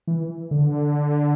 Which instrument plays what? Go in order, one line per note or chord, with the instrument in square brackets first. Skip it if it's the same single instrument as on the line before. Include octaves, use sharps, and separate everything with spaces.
[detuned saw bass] E3
D3